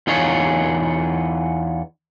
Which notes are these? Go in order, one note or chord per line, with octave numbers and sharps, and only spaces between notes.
E2 D#4 F4 G#4 C#5